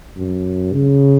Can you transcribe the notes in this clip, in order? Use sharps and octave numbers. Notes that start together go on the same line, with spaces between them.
F#2
C#3